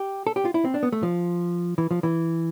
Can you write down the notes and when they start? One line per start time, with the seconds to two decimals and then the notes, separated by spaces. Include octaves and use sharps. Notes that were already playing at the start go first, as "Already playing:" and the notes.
Already playing: G4
0.27 A4
0.36 G4
0.45 F4
0.54 E4
0.65 C4
0.74 D4
0.83 B3
0.92 A3
1.03 F3
1.78 E3
1.91 F3
2.03 E3